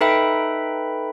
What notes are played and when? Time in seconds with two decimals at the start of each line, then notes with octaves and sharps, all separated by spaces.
0.01 D#4 A4 B4 E5 G5 B5